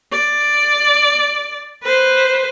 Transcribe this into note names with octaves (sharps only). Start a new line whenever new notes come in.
D5
B4 C5